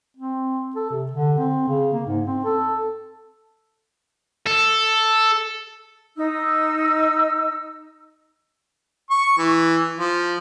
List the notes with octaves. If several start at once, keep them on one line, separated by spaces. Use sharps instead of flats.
C4
A4
C3
D3
C4
C#3
A#3
G#2
C4
A4
A4
D#4 E6
C#6
E3
F3